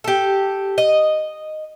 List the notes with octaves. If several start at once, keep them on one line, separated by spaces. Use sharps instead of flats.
G4 A4
D#5